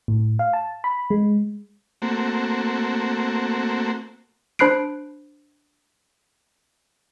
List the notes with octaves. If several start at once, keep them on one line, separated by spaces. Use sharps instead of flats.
A2
F5
A5
B5
G#3
A3 A#3 C4 F#4
D4 C5 B5 F#6 C7 D7